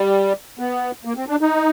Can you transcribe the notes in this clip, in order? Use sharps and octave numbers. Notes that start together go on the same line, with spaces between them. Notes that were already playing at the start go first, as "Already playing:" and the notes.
Already playing: G3
B3
A#3
C4
D4
D#4